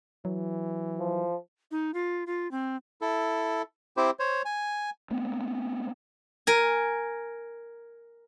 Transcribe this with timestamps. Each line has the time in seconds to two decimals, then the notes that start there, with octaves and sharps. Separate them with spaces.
0.25 E3 F#3
0.99 F3
1.71 D#4
1.94 F4
2.27 F4
2.51 C4
3.01 E4 A4
3.97 C4 E4 G4 C5
4.19 C5 C#5
4.45 G#5
5.10 A3 B3 C4
6.47 A#4 G#5